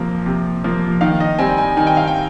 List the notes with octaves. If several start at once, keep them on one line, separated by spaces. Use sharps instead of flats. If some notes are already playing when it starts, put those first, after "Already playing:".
Already playing: C3 F3 A#3
C3
F3 A#3
D#3 F5
D#5
G3 C4 G#5
G#5
D#3 G#5
G5
F5
G5